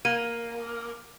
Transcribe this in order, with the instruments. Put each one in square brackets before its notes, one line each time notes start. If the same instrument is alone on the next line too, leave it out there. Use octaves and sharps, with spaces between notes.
[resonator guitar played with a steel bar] A#3 [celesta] D#7